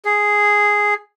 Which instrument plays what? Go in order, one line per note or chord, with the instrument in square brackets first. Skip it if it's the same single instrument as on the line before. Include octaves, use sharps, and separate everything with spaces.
[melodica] G#4